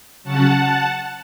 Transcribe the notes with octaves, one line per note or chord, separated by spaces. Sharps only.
C#3 F#3 C#4 F#5 A5